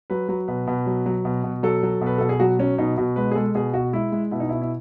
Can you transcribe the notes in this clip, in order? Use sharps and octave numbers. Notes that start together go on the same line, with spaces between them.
F#3 B4
F#3
B2 B4
B2
F#3
F#3
B2
B2
F#3 A4
F#3
B2
B4
B2 A4
G#4
F#3 F#4
F#3 C#4
B2 D#4
B2 F#4
G#3 B4
G#4
G#3 A4
B2 G#4
B2 F#4
G#3 E4
G#3
B2 E4
D#4
B2 E4
E4